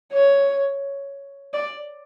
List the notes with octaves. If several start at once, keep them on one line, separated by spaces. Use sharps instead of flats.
C#5
D5